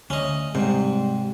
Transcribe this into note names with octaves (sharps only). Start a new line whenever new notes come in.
D2 C#4 D#5
G#2 C3 G3